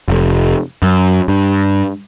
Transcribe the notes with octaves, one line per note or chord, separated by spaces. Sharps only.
F1
F#2
G2